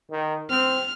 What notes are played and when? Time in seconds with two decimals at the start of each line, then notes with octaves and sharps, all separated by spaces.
0.11 D#3
0.50 C4 F6